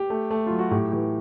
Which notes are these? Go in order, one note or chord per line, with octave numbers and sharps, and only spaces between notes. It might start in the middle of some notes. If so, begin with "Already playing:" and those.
Already playing: G4
A3
A3
F#3 F4
F#4
A2 G4
E3 G4